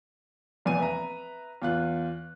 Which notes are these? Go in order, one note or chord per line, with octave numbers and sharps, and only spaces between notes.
F1 A#1 E2 G#5 D#7
B4 E5 A#5
E2 F4 F#6